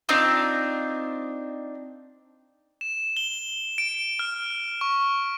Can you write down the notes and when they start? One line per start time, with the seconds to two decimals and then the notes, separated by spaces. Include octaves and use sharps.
0.09 C4 D4 D#4 F4
2.81 E7
3.17 G7
3.78 D7
4.19 F6
4.81 C#6